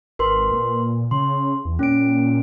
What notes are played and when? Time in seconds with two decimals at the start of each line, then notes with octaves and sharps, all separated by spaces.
0.19 G#1 A#4 B4 C6
0.51 A#2
1.11 C#3 C6
1.65 E2
1.79 A#2 C#4 D7